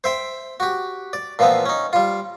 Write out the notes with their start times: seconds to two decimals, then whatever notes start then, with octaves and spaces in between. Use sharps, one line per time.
0.04 C5 E5 G5
0.60 F#4 G4
1.13 D5
1.39 A#2 E3 F3 B3 C4
1.66 C#4 D#4
1.93 G3 F4